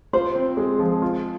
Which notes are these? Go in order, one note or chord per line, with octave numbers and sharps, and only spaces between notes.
F4 C5
C4
G#3
F3
F4